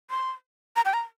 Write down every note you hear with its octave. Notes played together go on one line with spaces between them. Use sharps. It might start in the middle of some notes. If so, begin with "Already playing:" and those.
C6
A#5
G5
A#5